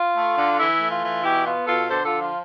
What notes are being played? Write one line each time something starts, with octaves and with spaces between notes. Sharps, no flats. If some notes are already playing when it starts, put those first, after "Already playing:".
Already playing: F4
A3
D3
E3 E4
A3
F4
E3
B2 E4 G4
B3 F4
B2 F4 A4
D3 A4 C5
F4 A4
F3
F4